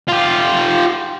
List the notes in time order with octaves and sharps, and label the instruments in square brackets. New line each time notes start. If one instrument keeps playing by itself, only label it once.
[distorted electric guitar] F4 G4